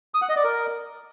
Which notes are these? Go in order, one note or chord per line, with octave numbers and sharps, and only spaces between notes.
D#6
F#5
D#5
D5
A#4